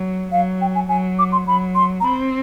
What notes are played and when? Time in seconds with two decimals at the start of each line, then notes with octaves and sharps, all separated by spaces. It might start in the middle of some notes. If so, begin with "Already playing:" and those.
Already playing: F#3
0.32 F#3 F5
0.61 G5
0.75 G#5
0.89 F#3 G#5
1.19 D6
1.32 C6
1.46 F#3 B5
1.75 C6
2.00 A#5
2.05 C4 B5